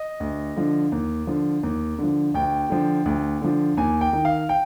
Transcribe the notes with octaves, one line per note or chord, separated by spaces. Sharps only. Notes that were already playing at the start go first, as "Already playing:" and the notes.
Already playing: D#5
D2
D3 F3
D#2
D3 F3
D#2
D3
F3
D2 G5
D3 F3
D2
D3 F3
D#2 G#5
G5
D#3
F5
G5